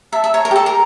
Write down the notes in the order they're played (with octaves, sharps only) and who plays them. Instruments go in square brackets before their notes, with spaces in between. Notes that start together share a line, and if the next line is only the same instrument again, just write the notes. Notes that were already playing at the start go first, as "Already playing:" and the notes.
[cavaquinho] E5 [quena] A#5
[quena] A5
[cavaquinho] E5
[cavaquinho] C#5 [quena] A#5
[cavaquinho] A#4
G4
A4
A#4